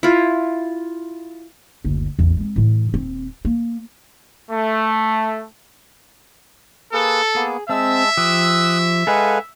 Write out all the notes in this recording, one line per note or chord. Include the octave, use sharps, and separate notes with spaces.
E4 F4
F#1 D2
A1 E2
G#3 C4
A2 E3
D#1 C4
A#3
A3
A#3 G#4 A4 B4
A#3 B3 G#4
G#3 C4 E5 A5 E6
F3 G4 D#6 E6 F#6
G#3 A4 B4 F5 F#5 G#5